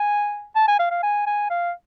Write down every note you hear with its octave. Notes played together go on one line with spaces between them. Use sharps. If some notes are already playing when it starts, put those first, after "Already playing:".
Already playing: G#5
A5
G#5
F5
F5
G#5
G#5
F5